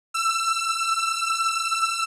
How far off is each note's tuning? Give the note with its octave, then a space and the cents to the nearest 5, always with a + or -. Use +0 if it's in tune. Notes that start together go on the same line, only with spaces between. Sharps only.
E6 +20